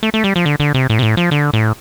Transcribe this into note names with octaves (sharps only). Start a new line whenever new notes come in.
A3
A3
G3
F3
D3
D3
C3
A2
C3
A2
F3
D3
A2